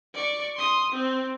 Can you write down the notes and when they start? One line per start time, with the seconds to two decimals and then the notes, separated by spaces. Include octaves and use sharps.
0.14 D5 C#6
0.56 C6 D#6
0.92 C4